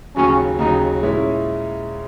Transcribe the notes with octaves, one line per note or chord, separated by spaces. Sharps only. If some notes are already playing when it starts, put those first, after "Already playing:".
D#2 C#3 F#3 C#4
D#2 C#3 F#3 D#4
A#2 G#3 C#4 E4